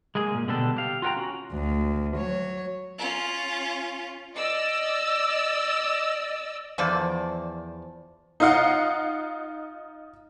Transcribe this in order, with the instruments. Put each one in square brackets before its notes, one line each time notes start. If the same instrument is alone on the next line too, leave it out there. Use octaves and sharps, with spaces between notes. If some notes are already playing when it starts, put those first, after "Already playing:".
[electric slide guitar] G#3 A#3 G#4
A#2
B2 D3 G3 D4 A4
G4 F5
F4 F#4 A4 G5 A#5
C#4 F#4
[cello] D2
F#3 C#5
[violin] C#4 F4
[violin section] D5 D#5 E6
[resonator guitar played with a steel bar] E2 F3 C5 D5
[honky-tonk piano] D#4 F4 D#5 F5 F#5